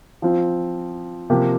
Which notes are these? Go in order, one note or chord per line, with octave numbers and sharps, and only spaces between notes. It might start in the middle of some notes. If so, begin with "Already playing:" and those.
F3 C4 F4
C3 F3 A#3 G4